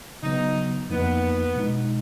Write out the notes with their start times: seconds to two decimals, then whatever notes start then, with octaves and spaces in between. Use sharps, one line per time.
0.23 C#3 F#3 B3 D#4
0.90 F2 F3 A#3 B3 D#4
1.56 B2 G#3 D#4